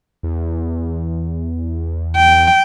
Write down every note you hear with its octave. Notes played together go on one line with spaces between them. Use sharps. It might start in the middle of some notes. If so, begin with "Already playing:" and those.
E2
G5